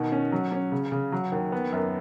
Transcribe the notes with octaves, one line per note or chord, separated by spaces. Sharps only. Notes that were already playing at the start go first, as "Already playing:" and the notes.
Already playing: B2 D#3
C#4
F#3
C#4
C#3
C#3
F#3
D#2
B3
F#2